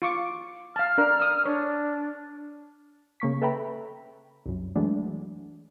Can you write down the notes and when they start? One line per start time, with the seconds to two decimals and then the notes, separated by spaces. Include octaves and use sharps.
0.02 F4 C#6 D6
0.76 F5 A5 F6
0.98 D4 A#4
1.19 D#6 E6
1.45 D4 C#5
3.20 C#3 A#3 C#6 B6
3.42 A4 B4 E5 G5 A#5 B5
4.46 C2 F#2
4.75 E3 F#3 G#3 A3 D4